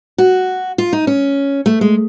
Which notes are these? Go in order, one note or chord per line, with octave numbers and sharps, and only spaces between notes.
F#4
F4
D#4
C#4
A3
G#3